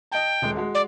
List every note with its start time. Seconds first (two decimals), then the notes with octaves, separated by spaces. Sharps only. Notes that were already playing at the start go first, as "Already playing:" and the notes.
0.12 D#5 G5 A5
0.42 D#1 G#3
0.57 G#3 F#4
0.74 D5